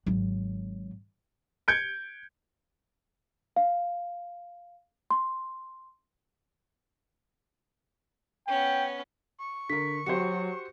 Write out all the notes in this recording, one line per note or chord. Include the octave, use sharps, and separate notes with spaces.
G#1 F#3
G6 G#6 C#7 D7
F5
C6
B3 C#4 G5
C#6
D3 A#4 B6
F#3 F#4 G4 C5 C#7